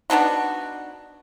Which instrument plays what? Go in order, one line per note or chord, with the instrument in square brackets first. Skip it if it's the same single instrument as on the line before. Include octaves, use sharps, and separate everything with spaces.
[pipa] B3 D4 D#4 F#4